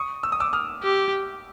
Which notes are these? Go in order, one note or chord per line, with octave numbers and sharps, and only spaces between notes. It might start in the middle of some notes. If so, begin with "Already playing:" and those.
Already playing: C#6 D#6
E6
D#6
D6 E6
D#6 F6
G4